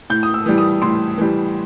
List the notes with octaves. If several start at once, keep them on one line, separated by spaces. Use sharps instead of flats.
A2 G6
D#6
E6
E3 G3
D#6
A2 C6
E3 G3